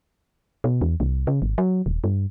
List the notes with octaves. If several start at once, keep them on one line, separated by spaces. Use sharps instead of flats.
B2
E2
C2
C#3
G#1
F#3
D#1
G2